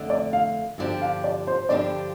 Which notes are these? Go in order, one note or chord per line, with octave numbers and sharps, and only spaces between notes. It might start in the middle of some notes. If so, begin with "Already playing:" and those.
Already playing: F2 D3 A3
D5
F5
G2 D3 F3 D4 G4
F5
D5
C5
G2 D3 F3 D4 G4 D5